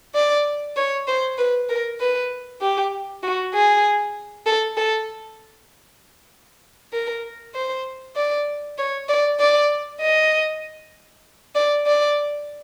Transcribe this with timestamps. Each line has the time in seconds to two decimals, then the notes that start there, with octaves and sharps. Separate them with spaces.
0.15 D5
0.77 C#5
1.07 C5
1.38 B4
1.69 A#4
2.00 B4
2.62 G4
3.23 F#4
3.54 G#4
4.46 A4
4.77 A4
6.93 A#4
7.55 C5
8.16 D5
8.78 C#5
9.09 D5
9.40 D5
10.01 D#5
11.55 D5
11.87 D5